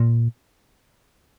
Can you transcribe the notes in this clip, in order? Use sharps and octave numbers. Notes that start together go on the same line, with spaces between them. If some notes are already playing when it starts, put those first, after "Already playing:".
Already playing: A#2